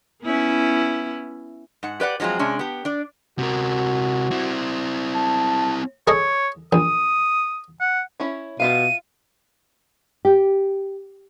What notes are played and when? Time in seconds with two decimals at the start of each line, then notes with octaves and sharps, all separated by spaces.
0.24 B3 C#4 E4
1.83 G#2 F#5
2.00 G4 B4 D5 F#5
2.20 F3 F#3 G#3 C4 F4
2.39 C3 G#3 C#4 D4
2.59 B3 G4
2.85 D4 D5
3.39 C3 F#4 A#4
4.31 C4 E4
5.15 A5
6.07 G#4 A4 C#5 D#5
6.73 A#1 D#6
7.81 F#5
8.20 C#4 E4 C#5
8.60 B2 F4 E5 F5 D#7
10.25 G4